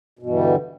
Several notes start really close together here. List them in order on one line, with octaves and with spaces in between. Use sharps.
B2 G2 E3 G3 D3